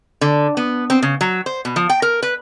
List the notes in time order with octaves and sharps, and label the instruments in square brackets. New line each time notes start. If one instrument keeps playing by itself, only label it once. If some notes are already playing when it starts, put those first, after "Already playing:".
[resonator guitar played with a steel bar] D3
B3
C4
C#3
F#3
C5
B2
F3
G5
A#4
B4